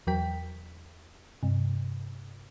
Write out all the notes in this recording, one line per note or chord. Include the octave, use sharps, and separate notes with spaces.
E2 F#3 A#4 G5 B6
G2 C3